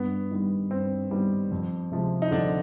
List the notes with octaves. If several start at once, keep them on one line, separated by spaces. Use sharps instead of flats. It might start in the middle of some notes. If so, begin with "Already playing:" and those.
Already playing: G2 B3
D#3 G3 B3
G2 C4
D#3 G3 B3
F2
C3 F3 G#3
D#4
F2 D3 D4